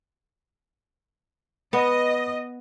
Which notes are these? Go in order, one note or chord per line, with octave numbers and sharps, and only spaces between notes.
B3 D#5